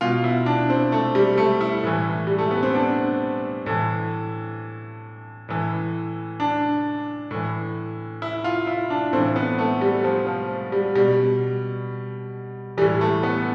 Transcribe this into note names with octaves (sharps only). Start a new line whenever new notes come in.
B2 F4
E4
D4
C4
A3
G3
A3
E4
A2 E3
G3
A3
B3
C4
D4
A2 E3
A2 E3
D4
A2 E3
E4
F4
E4
D4
A2 E3 C4
B3
A3
G3
F3
F3
G3
B2 G3
A2 E3 G3
A3
B3